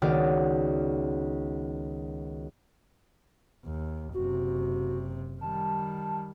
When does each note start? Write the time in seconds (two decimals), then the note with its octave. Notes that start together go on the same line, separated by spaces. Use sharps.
0.02 C#2 D#3 B3 F#4 D5 F6
3.65 D#2
4.14 F#1 C3 F#4
5.41 D#3 G3 A5